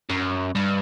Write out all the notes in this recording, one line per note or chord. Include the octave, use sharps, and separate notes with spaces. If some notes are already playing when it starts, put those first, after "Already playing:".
F#2
G2